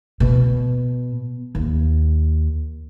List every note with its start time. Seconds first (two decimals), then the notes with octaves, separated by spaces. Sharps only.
0.20 B2
1.55 D#2